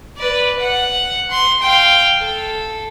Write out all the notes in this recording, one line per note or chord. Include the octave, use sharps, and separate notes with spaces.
B4 D5
F#5
C6
F5 G5
A4